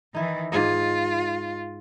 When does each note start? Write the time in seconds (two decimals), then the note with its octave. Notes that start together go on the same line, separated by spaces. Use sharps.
0.15 D#3 E3 D#4 E4
0.52 G#2 F4 G#4 D#5